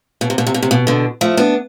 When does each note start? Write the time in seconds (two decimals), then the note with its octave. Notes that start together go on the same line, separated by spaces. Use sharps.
0.21 B2
0.30 C3
0.38 B2
0.47 C3
0.54 B2
0.62 C3
0.71 B2
0.87 B2 D3
1.21 F3 A3
1.37 B3 D4